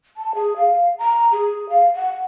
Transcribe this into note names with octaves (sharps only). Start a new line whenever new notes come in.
A5
G#4
F5
A#5
G#4
F5
F#5